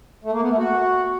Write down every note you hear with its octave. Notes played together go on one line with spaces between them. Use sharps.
A3
A#3
B3
A3
F#4